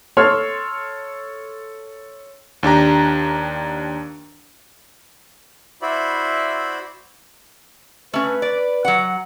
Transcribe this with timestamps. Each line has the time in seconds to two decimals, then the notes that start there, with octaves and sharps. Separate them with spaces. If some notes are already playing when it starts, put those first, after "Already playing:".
0.17 A4 C#5 C6 F6
2.63 D#2 D4 G4 A#5
5.82 E4 F#4 C5 D5 E5 B5
8.14 A3 C#4 B4
8.42 D5
8.85 F#3 F#5